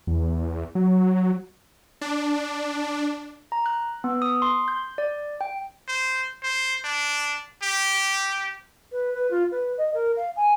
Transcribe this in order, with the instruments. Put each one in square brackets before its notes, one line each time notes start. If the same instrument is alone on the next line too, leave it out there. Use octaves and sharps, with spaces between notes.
[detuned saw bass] E2
F#3
[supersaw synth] D4
[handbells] A#5
F#6
B3
D#6
C6
G6
D5
G5
[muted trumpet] C5
C5
D4
G4
[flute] B4
B4
F4
B4
D#5
A#4
F5
G#5